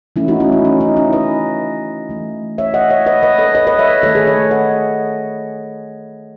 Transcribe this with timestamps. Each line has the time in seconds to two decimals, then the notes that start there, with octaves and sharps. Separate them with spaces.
0.16 E3 A3 C#4 E4
0.28 D#4 F#4
0.40 C#4 E4
0.52 D#4
0.65 C#4
0.81 D#4
0.97 C#4 E4
1.13 B4 D#5
2.09 E3 A3
2.58 C#5 E5
2.74 D#5 F#5
2.90 C#5 E5
3.06 B4 D#5
3.23 B4 D#5
3.39 A4 C#5
3.55 B4 D#5
3.67 B4 D#5
3.79 C#5 E5
4.03 D#3 A3 A4 C#5
4.15 G#4 B4
4.27 A4 C#5
4.51 D#5 F#5